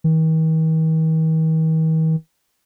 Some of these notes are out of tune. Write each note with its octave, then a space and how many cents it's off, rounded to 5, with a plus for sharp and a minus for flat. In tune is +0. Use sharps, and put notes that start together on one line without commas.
D#3 +45